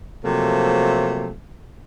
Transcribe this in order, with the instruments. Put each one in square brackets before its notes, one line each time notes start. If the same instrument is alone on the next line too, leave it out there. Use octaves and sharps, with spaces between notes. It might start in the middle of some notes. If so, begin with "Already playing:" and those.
[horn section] C3 F3 F#3 A3 A#3